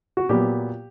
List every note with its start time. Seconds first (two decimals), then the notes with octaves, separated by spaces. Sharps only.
0.17 F#4
0.29 A#2 F#3 B3 G4